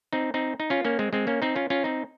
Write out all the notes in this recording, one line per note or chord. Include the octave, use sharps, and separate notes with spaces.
C4 D#4
C4 D#4
D#4
C#4 F4
A#3 C#4
G#3 C4
G#3 C4
A#3 C#4
C4 D#4
C#4 F4
C#4 F4
C4 D#4